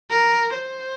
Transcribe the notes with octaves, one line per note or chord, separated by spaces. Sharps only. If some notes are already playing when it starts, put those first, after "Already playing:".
A#4
C5